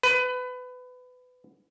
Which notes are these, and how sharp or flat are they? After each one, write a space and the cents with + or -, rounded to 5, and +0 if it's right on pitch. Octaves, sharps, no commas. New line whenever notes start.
B4 +25